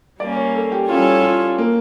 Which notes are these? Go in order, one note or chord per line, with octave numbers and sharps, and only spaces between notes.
G3 A#3 C#4 D5
C#5
A4
G4
G3 C#4 E4 F4 A4 C#5
F4
A#3